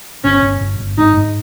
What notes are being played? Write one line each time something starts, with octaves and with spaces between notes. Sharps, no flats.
G1 C#4
G1
G1
G1
G#2 D#4
G#2